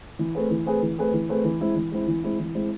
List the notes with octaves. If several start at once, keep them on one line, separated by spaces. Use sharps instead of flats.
E3
A3 C4 G#4 B4
E3
A3 C4 G#4 B4
E3
A3 C4 G#4 B4
E3
A3 C4 G#4 B4
E3
G#3 C4 E4
E3
G#3 C4 E4
E3
G#3 C4 E4
E3
G#3 C4 E4